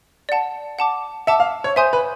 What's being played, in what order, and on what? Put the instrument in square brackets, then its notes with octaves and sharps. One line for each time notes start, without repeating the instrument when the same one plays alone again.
[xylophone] D5 F#5 A5
F#5 A5 D6
[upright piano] E5 [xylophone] F#5 A5 D6
[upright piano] F5
C#5
[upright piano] C5 [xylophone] E5 G#5 C6 D#6 G6
[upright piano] B4